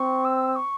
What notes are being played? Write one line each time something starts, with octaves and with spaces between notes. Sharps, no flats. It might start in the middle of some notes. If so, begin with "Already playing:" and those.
Already playing: C4 C#6
E6
C#6